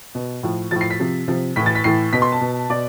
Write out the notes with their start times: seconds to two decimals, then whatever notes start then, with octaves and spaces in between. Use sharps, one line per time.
0.15 B2
0.43 A2 F3
0.71 A2 F3 A6
0.81 C7
0.90 B6
0.99 C3 F3
1.28 C3 F3
1.56 A2 E3 B6
1.66 A6
1.75 B6
1.84 A2 E3 C7
2.13 B2 B6
2.22 C6
2.32 A5
2.41 B2
2.70 B2 D5